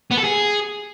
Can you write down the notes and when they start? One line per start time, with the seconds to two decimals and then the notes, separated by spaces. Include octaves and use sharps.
0.11 B3
0.18 A4
0.24 G#4